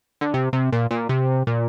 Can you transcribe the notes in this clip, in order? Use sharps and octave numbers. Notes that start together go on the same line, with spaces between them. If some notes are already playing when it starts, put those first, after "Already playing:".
D3
C3
C3
A#2
A#2
C3
A#2